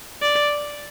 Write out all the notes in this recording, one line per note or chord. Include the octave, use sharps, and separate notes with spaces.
D5